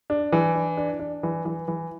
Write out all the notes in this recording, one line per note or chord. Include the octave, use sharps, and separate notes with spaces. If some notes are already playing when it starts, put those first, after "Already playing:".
D4
E3
D4
D4
D4
E3
E3
E3